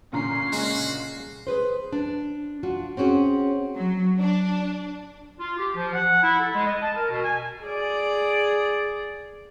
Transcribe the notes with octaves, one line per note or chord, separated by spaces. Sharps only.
A#2 D3 C#4 A#5 C7
C#3 G#3 F#4
G#4 B4 C5
D4
D4 F4 F#4
C4 C#4 F#4 G#4
F#3
D4
F4
G4
F3
F#5
E4
A4
G#3
D#5
A5
A#4
B2
G#5
G#4 D5